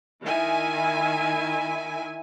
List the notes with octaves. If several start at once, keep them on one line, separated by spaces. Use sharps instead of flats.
D#3 E4 E5 G#5